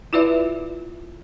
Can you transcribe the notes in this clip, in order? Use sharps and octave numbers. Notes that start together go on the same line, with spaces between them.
E4 F4 B4 D5 E5